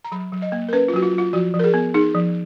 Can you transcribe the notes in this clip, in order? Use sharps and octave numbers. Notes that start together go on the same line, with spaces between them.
A#5
F#3 B5
F#3
D#5
A#3
A#4
C#4 B4
F4
F#3 F#4
F4
F#3
F4
F3 F#4
F3
A#4
G#4
B3
D#4 G#4
F3